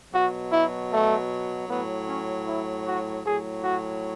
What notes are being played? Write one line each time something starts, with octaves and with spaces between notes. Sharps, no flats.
B2 F#3 F#4
E4
A3
A2 F#3 B3
C#4
E4
F#4
A2 F#3 G#4
F#4